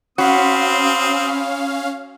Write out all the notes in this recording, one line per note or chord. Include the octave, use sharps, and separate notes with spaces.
C4 C#4 F#4 F5 B5 C6 D#6